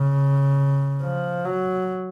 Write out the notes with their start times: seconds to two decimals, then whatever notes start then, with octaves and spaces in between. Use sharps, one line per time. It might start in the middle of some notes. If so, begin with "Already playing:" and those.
Already playing: C#3
1.02 F3
1.45 F#3